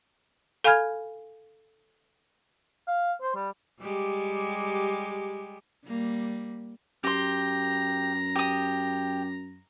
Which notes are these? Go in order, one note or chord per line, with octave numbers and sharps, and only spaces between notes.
A4 F5 G#5 B5 F6 G#6
F5
C5
G3
G3 G#3 G4
G3 A#3
F#2 G4 A#5 C6
G4 D#6